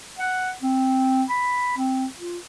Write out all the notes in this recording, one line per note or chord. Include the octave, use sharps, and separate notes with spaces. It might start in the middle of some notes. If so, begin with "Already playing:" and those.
F#5
C4
B5
C4
F4